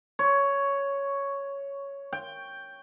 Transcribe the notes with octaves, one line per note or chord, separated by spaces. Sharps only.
C#5
G5